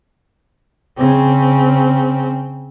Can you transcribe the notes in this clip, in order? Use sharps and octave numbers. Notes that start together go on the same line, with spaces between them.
C#3 C4